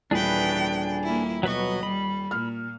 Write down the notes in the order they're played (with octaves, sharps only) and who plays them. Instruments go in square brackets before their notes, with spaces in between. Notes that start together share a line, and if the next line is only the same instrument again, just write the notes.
[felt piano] D#1 [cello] E3 G5 [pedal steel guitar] D4 G#4 B4
[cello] A#3 E4
[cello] B2 D#5 [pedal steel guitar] F#3 B4 C#6
[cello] G3 [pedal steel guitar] B5
[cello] A#2 [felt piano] F6